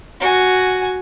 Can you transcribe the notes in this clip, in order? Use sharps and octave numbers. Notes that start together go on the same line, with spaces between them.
F#4 G#5